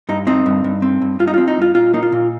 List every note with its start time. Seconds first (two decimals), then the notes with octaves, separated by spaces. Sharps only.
0.09 G2 D#4
0.27 C4 D#4
0.46 G2
0.64 G2
0.82 C4
1.02 G2
1.19 G2 F4
1.27 D#4
1.34 C4 F4
1.48 D#4
1.57 G2 F4
1.75 A#2 F4
1.94 A#3 D#4
2.03 F4
2.12 A#2